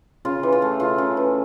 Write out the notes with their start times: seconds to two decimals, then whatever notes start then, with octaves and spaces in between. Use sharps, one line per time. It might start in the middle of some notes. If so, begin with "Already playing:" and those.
0.25 C#3 F4
0.43 E3
0.52 F4
0.62 A3
0.80 C#3 F4
0.98 C#3
1.17 E3